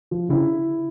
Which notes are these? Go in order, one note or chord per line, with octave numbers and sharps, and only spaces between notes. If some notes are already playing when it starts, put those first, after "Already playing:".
F3
C#3 E4